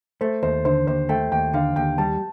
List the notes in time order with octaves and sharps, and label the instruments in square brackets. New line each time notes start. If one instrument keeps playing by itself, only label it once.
[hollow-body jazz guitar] A3 [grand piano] C5
[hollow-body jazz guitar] D#2 [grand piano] C5
[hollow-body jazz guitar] D3 [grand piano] C5
[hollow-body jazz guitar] D#2 [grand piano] C5
[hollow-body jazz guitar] A3 [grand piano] G5
[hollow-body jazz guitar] D#2 [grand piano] G5
[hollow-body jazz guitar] D3 [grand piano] F5
[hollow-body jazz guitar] D#2 [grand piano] G5
[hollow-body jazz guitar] G3 [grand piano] A5